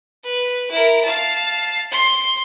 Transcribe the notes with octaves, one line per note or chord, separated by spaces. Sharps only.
B4
E4 A#4
F5 A5
C6